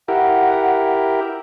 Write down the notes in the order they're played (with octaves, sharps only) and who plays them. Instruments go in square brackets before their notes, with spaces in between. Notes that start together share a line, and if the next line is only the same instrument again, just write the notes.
[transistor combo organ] E4 G4 A#4 [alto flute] F#5